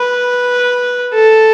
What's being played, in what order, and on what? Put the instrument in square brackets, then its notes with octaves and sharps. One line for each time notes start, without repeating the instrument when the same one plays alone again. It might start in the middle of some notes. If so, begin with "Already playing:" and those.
Already playing: [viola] B4
A4